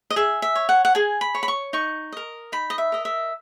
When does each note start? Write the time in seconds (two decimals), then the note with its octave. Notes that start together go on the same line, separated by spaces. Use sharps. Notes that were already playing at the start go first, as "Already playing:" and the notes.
0.10 D#5
0.16 G#4 E5
0.42 E5
0.55 C#5
0.69 F#5
0.85 F#5
0.95 G#4 G#5
1.21 B5
1.35 C#5
1.43 B5
1.48 C#6
1.73 D#4 C#6
2.12 A#4 D#5
2.52 D#4 B5
2.70 D#5
2.78 E5
2.92 A#4 D#5
3.05 E5